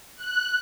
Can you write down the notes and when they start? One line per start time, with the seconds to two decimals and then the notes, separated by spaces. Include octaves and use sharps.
0.17 F#6